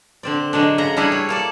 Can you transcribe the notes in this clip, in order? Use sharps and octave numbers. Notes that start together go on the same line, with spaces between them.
D3 C4 D5
D3 F#3 G#3 D4
C#3 F#5 A#5
G3 D4 E4 G#4 A4
C#5
A#3 A4 D5